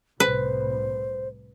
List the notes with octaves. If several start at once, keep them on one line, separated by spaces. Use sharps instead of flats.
C2 A2 B4 C5